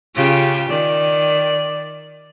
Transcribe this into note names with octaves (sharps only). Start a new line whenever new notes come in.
C#3 F4 G4
D#3 D5